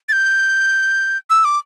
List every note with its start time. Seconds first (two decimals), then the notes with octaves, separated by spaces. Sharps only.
0.09 A6
0.12 G6
1.30 E6
1.45 D6